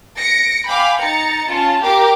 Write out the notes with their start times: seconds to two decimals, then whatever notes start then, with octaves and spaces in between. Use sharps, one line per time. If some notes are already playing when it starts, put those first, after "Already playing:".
0.18 A#6 C#7 D7
0.68 F5 G5 G#5 B5 D6
1.01 D#4 A#5 A6 C#7
1.49 C#4 F4 A5
1.83 G4 A#4 F5 D6